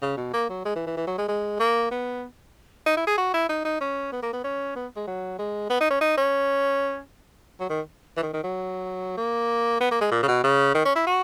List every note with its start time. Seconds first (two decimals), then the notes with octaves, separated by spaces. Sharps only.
0.02 C#3
0.17 B2
0.33 A#3
0.49 F#3
0.65 G#3
0.76 E3
0.86 E3
0.97 E3
1.07 F#3
1.18 G#3
1.28 G#3
1.60 A#3
1.91 B3
2.86 D#4
2.97 E4
3.07 G#4
3.18 F#4
3.34 E4
3.49 D#4
3.65 D#4
3.81 C#4
4.12 B3
4.23 A#3
4.33 B3
4.44 C#4
4.76 B3
4.96 G#3
5.07 F#3
5.39 G#3
5.70 B3
5.81 D#4
5.91 C#4
6.01 D#4
6.17 C#4
7.60 F#3
7.70 D#3
8.17 E3
8.23 D#3
8.33 D#3
8.44 F#3
9.17 A#3
9.80 B3
9.91 A#3
10.01 G#3
10.11 A#2
10.23 C#3
10.28 B2
10.44 C#3
10.75 D#3
10.85 C#4
10.96 E4
11.07 F#4